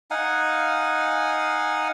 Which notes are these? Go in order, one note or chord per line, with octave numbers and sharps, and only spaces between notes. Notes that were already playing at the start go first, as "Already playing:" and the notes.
D#4 F5 F#5 G#5